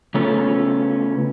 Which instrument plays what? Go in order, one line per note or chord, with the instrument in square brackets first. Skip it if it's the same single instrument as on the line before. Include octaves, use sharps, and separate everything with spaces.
[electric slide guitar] C#3 A3 B3 C#4 F4 A4